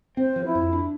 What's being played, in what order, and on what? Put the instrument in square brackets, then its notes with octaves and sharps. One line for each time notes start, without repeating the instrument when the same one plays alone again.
[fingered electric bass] C4 [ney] C5
[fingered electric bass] F3
[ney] E4
[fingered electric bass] F2
D4